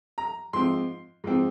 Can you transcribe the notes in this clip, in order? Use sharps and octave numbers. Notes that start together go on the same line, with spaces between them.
A#5
G#2 F3 C4 C6
G#2 F3 C4